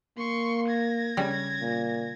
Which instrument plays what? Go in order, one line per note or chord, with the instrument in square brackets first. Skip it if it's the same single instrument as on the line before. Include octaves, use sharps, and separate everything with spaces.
[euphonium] A#3 [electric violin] C6 C#6
[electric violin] G#6 A#6
[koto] C#3 G3
[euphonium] A#2